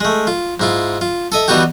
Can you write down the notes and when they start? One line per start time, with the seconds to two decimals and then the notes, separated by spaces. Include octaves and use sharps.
0.01 G#3 A3
0.27 F4
0.60 G#2 E4 F4
1.01 F4
1.32 A4 D#5 E5
1.48 E3 G3 B3 D#4 F#4 G4